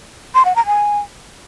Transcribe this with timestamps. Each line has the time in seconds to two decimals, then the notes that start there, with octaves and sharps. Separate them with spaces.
0.35 C6
0.45 F#5
0.56 A#5
0.66 G#5